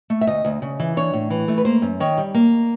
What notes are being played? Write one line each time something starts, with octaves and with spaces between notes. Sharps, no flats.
A3
E5
D2 D#5
D2
C#3
E3
D4 C#5
A2
E3
A3
B4
A#3 C5
F#2
D#3 C#5
G3
A#3